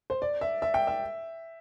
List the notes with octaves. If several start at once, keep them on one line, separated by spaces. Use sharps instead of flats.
C5
D5
E5
E5
G5
E5